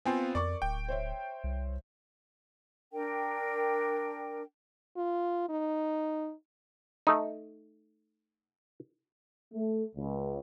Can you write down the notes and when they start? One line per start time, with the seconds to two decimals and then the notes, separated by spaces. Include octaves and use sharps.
0.05 B3 C4 F4 F5 G5 G#5
0.35 F2 A#4 D5 C#6 D6
0.62 D1 G5
0.88 C5 C#5 E5
1.44 C2
2.93 D4 A#4 G5
4.97 F4
5.49 D#4
7.07 A3 D#4
9.54 A3
9.96 C#2